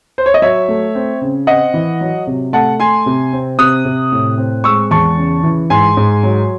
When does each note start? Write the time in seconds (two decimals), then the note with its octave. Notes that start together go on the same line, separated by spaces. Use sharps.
0.18 C5
0.26 C#5
0.34 D#5
0.42 F#3 C#5 E5
0.68 A3
0.95 C4
1.21 C#3
1.47 C4 D#5 F#5
1.74 E3
2.01 F#3
2.27 C3
2.53 A3 F#5 A5
2.80 A3 G#5 C6
3.06 C3
3.33 C4
3.58 C3 D#6 F#6
3.85 C3
4.12 A2
4.38 C4
4.64 G#3 C#6 E6
4.91 E2 A5 C#6
5.17 C#3
5.43 E3
5.70 G#2 G#5 C6
5.97 G#2
6.23 F#3